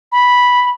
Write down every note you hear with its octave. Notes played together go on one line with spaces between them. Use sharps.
B5